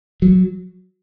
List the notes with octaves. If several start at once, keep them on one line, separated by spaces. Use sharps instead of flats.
F#3